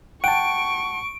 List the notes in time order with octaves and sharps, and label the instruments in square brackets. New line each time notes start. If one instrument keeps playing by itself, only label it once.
[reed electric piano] F#5 A5 [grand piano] G5 [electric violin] C#6 [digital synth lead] D7